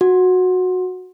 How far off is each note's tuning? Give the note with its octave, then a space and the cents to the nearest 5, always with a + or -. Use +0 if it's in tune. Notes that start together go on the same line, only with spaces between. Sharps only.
F#4 -15